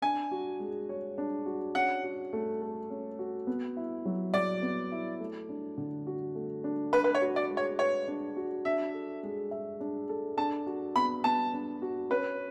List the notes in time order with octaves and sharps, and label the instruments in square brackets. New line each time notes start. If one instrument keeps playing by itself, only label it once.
[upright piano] D4 [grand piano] G#5
[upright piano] F#4
G#3
C#5
D4
F#4
[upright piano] C#4 [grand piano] F#5
[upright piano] F#4
A3
A4
C#4
F#4
B3
E4
F#3
[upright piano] F#3 [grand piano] D5
[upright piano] B3
E4
A3
D4
D3
F#4
A3
D4
[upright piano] D4 [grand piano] B4
[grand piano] B4
C#5
[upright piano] F#4
[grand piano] D5
[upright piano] G#3
[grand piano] C#5
[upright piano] B4 [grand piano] C#5
[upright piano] D4
F#4
[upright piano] D4 [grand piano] E5
[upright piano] A4
G#3
E5
D4
A4
[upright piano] D4 [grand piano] A5
[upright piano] F#4
[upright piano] B3 [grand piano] B5
[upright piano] B3 [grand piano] A5
[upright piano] D4
F#4
[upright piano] C#4 [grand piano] B4